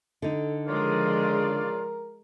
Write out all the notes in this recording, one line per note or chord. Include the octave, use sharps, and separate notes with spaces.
D3 D#4 A4
C#3 F3 G#3 F4 A#4 D5